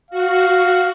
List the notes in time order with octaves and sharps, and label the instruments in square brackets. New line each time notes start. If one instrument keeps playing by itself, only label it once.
[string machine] F#4 [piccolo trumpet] F5